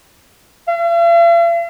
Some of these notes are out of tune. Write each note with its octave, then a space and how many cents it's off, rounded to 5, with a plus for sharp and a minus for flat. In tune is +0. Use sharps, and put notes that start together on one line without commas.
F5 -45